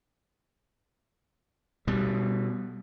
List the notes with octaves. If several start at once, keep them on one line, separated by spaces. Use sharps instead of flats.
B2 G3